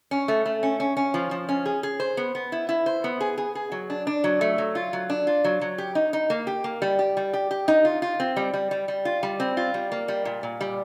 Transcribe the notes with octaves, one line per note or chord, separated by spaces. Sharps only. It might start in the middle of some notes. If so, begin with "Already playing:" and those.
C#4
A3
A3
C#4
C#4
C#4
F3
F3
C#4
G#4
G#4
C5
B3
B3
E4
E4
C5
B3
G#4
G#4
G#4
F#3
D4
D4
F#3
A3
F#3
F4
F#3
D4
F4
F#3
F#3
G4
D#4
D#4
A#3
G4
A#3
G3
G4
G3
G4
G4
D#4
F4
F4
C4
G3
G3
G3
G3
F4
G3
C4
F4
G3
A#3
G3
A#2
A#2
G3